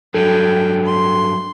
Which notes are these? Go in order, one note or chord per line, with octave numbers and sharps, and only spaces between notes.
G2 F#3 A4 G5
C6